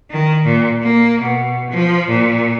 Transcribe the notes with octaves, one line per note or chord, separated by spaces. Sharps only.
D#3
A#2
A#3
B2
F3
A#2